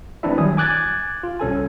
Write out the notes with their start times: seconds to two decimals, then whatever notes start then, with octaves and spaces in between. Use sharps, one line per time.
0.23 E3 A3 C4 D4 E4 E5
0.37 D#3 F#3 G3 G#5 D#6
0.57 G#5 D6 F#6 G#6 A6
1.23 F4
1.40 C2 C#4 A4 G#5